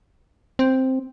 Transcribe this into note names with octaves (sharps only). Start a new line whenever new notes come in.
C4